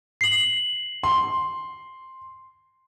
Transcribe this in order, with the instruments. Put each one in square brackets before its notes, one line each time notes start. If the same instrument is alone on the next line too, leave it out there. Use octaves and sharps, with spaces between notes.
[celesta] C7 F#7
[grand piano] C6